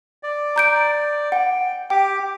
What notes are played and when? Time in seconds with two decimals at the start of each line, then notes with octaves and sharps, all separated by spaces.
0.23 D5
0.56 A#5 G6 D7
1.32 F#5 G5
1.90 G4 G5 D6